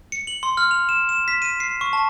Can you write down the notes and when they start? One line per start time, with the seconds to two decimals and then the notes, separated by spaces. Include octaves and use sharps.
0.12 C#7
0.27 F#7
0.43 C6
0.57 F6
0.71 F7
0.89 E7
1.09 E7
1.28 B6
1.42 D#7
1.60 C7
1.81 C#6
1.93 A5